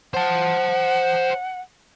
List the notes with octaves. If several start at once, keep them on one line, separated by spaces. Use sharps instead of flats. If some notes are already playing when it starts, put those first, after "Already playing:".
C5 F#5 A5